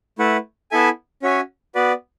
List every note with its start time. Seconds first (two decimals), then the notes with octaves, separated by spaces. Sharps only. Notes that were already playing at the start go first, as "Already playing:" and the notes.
0.19 A3 E4 B4 F#5
0.71 B3 E4 A4 E5 G#5
1.22 C#4 F#4 C#5 E5 G#5
1.75 B3 F#4 B4 D5